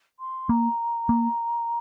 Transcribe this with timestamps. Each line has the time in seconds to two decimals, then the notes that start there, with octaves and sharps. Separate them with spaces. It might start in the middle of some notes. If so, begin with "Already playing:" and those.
0.19 C6
0.49 A#3 A#5
1.09 A#3